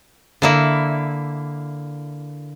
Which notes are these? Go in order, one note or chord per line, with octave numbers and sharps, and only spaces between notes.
D3 A#3 E4